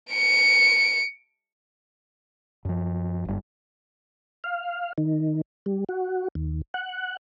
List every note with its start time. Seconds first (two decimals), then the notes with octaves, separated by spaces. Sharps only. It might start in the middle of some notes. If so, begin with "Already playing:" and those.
0.13 C#7 D7
2.65 F#2 F3
3.25 F#1 G2
4.44 F5
4.98 D#3
5.66 G3
5.89 F#4
6.35 D#2
6.74 F#5